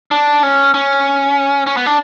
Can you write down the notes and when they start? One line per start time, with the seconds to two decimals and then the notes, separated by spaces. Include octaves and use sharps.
0.11 D4
0.43 C#4
0.74 C#4
1.67 C#4
1.77 B3
1.86 D4